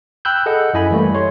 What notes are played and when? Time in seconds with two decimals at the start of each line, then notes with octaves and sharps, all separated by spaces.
0.25 G5 B5 E6 F#6 G6
0.46 G#4 A4 D#5 F#5
0.74 F#2 E4 D#5 G#5 B5
0.91 E3 G3 A3 A#3
1.15 C#5 C6